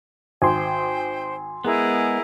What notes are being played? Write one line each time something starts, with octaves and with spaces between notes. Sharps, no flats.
G#1 C5 G5 G#5 C6
G#3 B3 E4 G#4 A#4